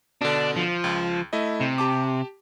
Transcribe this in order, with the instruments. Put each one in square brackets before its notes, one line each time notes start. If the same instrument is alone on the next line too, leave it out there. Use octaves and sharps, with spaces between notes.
[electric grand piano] B2 D3 [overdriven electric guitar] D4
[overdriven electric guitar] F3
[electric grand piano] C#2
A3 E4 D#5
[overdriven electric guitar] C3
[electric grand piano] G4 A5 D6